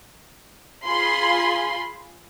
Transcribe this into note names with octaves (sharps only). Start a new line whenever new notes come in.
F4 G#4 B5 C6